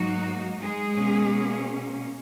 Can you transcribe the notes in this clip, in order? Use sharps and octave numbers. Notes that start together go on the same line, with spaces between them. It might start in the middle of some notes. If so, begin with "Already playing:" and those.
Already playing: G#2 F#3 A#3 D#4 F#4
G#3 G#4
B2 A#3 C#4